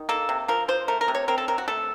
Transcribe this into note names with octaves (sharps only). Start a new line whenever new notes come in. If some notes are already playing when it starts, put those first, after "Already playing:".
Already playing: D#3
A#3 A4
C3
F3 A#4
F3 C5
A3 A#4
A#4
C3
C#5
C4 A#4
A4
C3 A#4
F#4
A3 A4